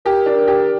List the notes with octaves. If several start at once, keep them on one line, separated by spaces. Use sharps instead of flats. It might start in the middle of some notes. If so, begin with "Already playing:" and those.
G4 A#4
D4
G4